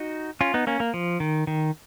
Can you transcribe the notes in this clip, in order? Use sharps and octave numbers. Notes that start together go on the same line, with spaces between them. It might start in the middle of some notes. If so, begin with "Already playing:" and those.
Already playing: D#4 F#4
C#4 F4
B3 D#4
A#3 C#4
A#3
F3
D#3
D#3